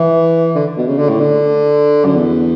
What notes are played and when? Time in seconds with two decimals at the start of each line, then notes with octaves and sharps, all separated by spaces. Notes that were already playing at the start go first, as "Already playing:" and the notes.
Already playing: E3
0.55 D3
0.77 B2
0.87 C#3
0.99 D3
1.09 A2
1.20 D3
2.05 F#2
2.16 E2